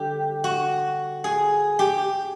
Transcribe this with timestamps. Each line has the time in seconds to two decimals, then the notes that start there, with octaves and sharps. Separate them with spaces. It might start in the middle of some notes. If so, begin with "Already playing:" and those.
Already playing: D3 G3 G4
0.44 F#4
1.24 G#4
1.79 G4